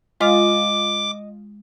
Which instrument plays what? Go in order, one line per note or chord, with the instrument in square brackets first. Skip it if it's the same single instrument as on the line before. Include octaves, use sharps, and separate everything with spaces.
[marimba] G#3 [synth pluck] F4 [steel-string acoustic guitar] D#5 [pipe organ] D6